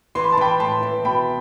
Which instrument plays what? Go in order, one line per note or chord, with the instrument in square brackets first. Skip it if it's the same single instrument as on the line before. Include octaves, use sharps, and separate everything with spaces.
[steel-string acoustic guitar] E3 [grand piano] C6
[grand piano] B5
A5
[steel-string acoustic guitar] E3 [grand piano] G5 B5
[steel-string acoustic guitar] A2 [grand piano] A5 C6
[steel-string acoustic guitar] E3
[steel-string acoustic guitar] B2 [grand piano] G5 B5